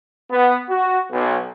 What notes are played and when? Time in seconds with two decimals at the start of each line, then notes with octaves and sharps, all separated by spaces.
0.31 B3
0.69 F#4
1.11 B1